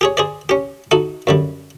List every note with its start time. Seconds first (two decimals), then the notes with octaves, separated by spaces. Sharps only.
0.01 G4 G#4 C#5
0.17 G#4 C5 D5
0.49 C#4 G4
0.91 D#4 F#4 A4
1.27 F#2 D3 G3